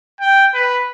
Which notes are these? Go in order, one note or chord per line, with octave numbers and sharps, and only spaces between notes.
G5
B4